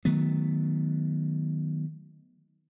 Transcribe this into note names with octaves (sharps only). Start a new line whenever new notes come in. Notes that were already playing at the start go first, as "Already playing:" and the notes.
D#3 F#3 A3 B3